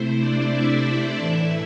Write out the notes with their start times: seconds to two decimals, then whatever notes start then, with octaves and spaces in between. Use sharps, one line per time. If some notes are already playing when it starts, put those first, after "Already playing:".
Already playing: C3 A3 E4 C5
0.20 D4 D5
0.52 E4 E5
1.18 A2 E3 A3